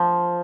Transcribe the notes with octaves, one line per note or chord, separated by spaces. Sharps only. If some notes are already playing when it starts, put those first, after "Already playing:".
Already playing: F3